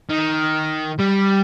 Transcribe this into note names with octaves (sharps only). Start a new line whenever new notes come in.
D#3
G3